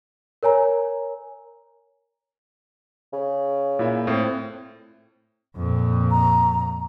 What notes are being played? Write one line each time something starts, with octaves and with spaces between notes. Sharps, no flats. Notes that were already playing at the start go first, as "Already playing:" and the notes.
A#4 C#5 G#5 A#5
C#3
A#2 E4 E5
A2 C4 C5
F2 A#2
A#5